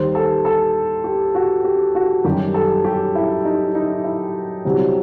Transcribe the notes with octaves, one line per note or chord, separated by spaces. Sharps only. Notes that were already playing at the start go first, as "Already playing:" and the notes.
Already playing: D#2 D#3 G3 C5
A4
A4
G4
F#4
G4
F#4
F#2 D#3 G3 G4
A4
G4
E4
D#4
D#4
E4
C2 C3 F#3